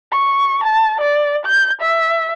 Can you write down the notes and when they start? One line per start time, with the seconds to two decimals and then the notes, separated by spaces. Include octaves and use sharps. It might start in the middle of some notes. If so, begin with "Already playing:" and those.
0.12 C#6
0.63 A5
1.01 D5
1.45 G6
1.81 E5